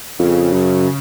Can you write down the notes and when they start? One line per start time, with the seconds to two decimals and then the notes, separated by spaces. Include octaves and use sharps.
0.19 F2 C#3
0.53 F#2